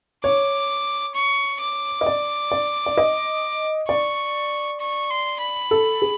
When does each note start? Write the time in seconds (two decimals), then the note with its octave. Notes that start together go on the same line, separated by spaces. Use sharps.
0.24 C#5 D6
1.15 C#6
1.61 D6
2.01 D#5
2.06 D5
2.52 D5
2.86 D5
2.97 D#5
3.89 D5 C#6
4.80 C#6
5.10 C6
5.41 B5
5.71 A4
6.02 G#4